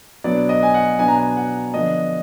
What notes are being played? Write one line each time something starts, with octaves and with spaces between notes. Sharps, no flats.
B2 F#3 B3 D4 D5
D#5
G#5
F#5
B2 F#3 B3 D4 G#5
A#5
G#5
F#5
D3 F3 B3 D4 D#5